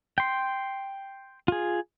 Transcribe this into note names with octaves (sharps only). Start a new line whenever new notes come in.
G5 C6
F4 G#4